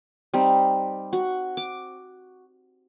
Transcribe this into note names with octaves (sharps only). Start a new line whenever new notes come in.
G3 C4 D#4
F#4
D6